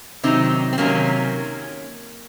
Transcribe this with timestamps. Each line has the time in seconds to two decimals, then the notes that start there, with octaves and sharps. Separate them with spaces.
0.23 C3 D#3 F#3 C4 D#4
0.73 C4
0.78 C3 D#3 F#3 A#3 C#4